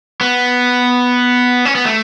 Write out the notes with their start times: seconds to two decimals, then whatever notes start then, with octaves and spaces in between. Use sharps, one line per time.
0.21 B3
1.65 C#4
1.75 B3
1.85 A3